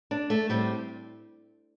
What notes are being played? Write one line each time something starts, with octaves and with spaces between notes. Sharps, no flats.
D4
A3
A2 G3 C4